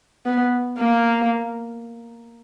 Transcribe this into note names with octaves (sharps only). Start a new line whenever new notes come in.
B3
A#3